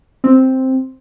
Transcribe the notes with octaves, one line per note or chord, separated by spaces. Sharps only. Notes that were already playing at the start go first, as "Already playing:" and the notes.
C4